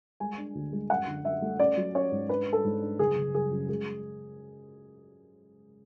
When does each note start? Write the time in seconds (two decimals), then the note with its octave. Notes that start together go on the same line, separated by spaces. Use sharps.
0.20 G#3 G#5
0.38 D4
0.55 D2
0.72 G#3
0.90 F#2 F#5
1.07 D3
1.24 F#2 E5
1.42 A3
1.59 C#4 D5
1.77 F#3
1.95 C#4 C#5
2.12 G#2
2.29 D4 B4
2.47 D4
2.53 A4
2.64 G#2
2.82 D4
2.99 F#1 G#4
3.16 F#1
3.34 F#1 G#4
3.51 F#2
3.69 G#3 G#4